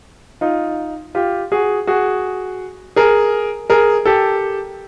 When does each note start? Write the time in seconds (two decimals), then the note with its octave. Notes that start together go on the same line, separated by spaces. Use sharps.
0.41 D#4 F4
1.15 F4 G4
1.52 F#4 G#4
1.87 F#4 G#4
2.96 G#4 A#4
3.70 G#4 A#4
4.05 G4 A4